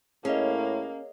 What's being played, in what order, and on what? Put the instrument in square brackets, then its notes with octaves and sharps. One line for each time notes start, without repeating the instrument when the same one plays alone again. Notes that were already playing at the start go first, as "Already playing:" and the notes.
[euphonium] A2 [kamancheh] A#3 [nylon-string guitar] C#4 [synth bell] G#4 C#5 D#5